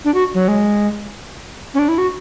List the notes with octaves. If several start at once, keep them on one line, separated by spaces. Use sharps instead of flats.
D4
F#4
F#3
G#3
C#4
D4
E4
F#4